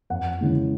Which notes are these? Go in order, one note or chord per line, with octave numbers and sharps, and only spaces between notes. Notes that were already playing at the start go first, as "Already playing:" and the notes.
F2 F#5
C#3 E3 G#3